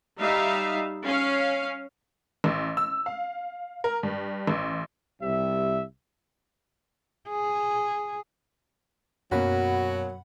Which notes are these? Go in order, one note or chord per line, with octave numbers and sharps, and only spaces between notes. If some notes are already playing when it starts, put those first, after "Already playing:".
G3 D#4 E5 F5
C#4 F5
A1
E6
F5
A#4
G2
A1
C2 C3 G3 E5
G#4
F#2 B2 F#3 A#3 C#4 F#4 F#5 B5